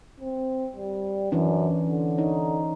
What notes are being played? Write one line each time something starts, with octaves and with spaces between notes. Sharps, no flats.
C4
G3
F#2 E3 C#4 D4
D3
D#4 C#5